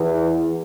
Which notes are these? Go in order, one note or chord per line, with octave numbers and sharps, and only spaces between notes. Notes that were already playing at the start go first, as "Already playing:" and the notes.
Already playing: E2 E3